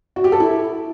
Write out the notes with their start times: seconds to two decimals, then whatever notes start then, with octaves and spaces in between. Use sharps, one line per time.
0.16 F#4
0.24 G4
0.32 A4
0.40 E4